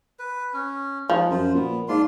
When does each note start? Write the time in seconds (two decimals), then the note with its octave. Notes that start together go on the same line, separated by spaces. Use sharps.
0.19 B4
0.54 C#4
1.10 F3 G#3 D#4
1.31 F#2 F4 C5
1.54 A#2 B3
1.88 G#2 D4 F4 C6